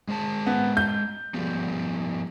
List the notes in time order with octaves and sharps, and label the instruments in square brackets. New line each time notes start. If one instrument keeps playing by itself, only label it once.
[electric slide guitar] G#3 C5 A5
[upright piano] B3
G6
[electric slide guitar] F3 G3 B3